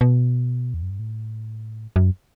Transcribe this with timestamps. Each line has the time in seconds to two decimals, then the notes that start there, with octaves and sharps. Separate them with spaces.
0.01 B2
0.74 E2
0.83 F#2
0.90 G2
0.99 A2
1.96 F#2